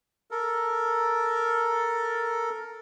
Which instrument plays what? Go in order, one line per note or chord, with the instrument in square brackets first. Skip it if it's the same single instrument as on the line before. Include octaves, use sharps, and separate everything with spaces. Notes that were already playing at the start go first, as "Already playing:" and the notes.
[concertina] A4 A#4